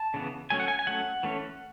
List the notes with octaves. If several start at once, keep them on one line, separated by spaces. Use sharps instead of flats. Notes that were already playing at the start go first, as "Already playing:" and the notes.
Already playing: A5
C#3 E3 B3
F#3 A3 C#4 G#5
F#5
G#5
G#5
F#3 A3 C#4 F#5
E3 A3 C#4